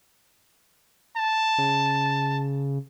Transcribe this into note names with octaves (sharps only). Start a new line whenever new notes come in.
A5
C#3